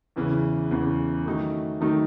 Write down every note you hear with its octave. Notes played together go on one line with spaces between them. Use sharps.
E2 C#3 E3
E2 C#3 E3
D#3 F#3 A3 D#4
D#3 F#3 A3 D#4